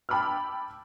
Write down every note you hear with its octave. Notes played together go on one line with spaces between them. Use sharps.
G5 A5 B5 D6 E6 F6